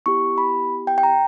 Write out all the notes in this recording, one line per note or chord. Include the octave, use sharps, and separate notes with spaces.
B3 E4 G4 C#6
B5
G5
G5
A#5